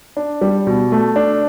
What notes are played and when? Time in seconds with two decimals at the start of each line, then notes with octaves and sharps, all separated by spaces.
0.17 D4
0.41 G3
0.67 B2
0.92 A3
1.16 D4